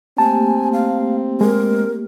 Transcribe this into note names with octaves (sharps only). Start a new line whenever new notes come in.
A3 A#3 C4 G4 G#5 A5
F5
G#3 A#4